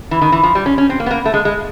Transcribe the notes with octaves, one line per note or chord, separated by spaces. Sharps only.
E3
D#3
E3
F3
G3
C#4
C#4
C4
A#3
B3
A#3
A3
G#3
G#3